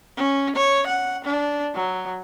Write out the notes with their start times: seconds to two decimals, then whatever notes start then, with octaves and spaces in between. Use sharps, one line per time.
0.17 C#4
0.56 C#5
0.87 F#5
1.25 D4
1.75 F#3